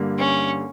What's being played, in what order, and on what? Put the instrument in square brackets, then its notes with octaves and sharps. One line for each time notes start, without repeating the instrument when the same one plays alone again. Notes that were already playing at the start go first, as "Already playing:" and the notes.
Already playing: [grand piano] G2 D3 G3 A#3
[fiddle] C#4